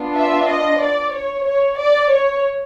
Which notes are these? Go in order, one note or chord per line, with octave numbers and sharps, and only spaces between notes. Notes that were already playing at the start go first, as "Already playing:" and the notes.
Already playing: B3 D4 F4
E5
D#5
D5
C#5
C#5
D5
C#5